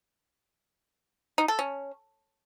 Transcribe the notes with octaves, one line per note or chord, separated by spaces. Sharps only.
D#4
A4
C#4